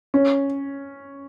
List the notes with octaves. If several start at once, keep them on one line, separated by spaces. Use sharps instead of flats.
C#4